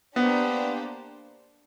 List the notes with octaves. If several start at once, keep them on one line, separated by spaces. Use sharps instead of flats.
A#3 B3 D4 G4 C5